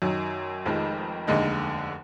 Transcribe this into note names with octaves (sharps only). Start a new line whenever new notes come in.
F#2 D#3 F#3
F1 F2 D#3 G#3
F1 D#2 D3 G#3 D#4